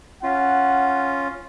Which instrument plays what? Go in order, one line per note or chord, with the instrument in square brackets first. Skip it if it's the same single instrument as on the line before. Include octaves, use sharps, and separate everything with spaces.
[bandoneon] C#4 F4 [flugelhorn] F#5